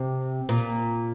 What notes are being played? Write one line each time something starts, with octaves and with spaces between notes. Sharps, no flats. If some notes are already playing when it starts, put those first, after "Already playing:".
Already playing: C3
A#2